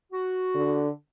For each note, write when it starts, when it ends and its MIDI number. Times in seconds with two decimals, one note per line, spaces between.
0.12 0.84 66
0.55 0.89 50